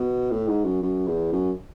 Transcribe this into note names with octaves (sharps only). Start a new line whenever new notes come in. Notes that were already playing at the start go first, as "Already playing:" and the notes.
Already playing: B2
A2
G#2
F#2
F#2
E2
F#2